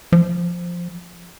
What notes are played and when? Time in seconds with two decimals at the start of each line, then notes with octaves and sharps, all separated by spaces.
0.12 F3